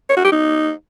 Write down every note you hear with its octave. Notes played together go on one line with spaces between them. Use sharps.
C#5
F#4
G4
D#4